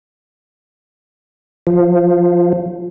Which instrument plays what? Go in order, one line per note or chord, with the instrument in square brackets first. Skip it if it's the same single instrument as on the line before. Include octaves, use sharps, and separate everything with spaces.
[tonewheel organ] F3